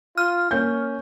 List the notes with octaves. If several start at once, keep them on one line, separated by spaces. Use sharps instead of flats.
F4 F6
A#3 C#4 G6